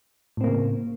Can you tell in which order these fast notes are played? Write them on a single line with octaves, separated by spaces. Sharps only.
A2 C4 A#3 C#3